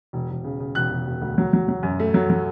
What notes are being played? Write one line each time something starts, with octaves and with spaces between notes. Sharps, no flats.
E1
E1
C#3
C#3
E1 F#6
E1
E1
D2
F#3
F#3
F#3
F#2
A3
F#3
F#3